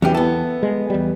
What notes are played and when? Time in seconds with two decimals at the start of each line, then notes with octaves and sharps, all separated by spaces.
0.02 E2 E3 F#3 C#4 G4
0.14 B3 A4
0.63 G#3
0.90 E2 G3